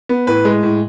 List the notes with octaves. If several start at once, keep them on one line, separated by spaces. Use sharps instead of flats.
B3
A2 B4
G#3
A2